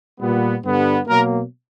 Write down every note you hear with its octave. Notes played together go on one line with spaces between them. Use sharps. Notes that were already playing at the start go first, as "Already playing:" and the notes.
A#2 G3 B3
G2 D3 G3 B3
B2 F#3 A#3 A#4